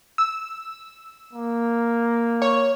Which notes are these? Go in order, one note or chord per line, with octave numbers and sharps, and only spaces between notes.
E6
A#3
C#5